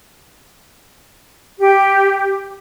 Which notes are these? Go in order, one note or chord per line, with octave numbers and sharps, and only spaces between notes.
G4